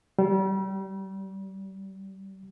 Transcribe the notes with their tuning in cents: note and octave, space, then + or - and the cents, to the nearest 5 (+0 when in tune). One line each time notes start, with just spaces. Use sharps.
G3 -30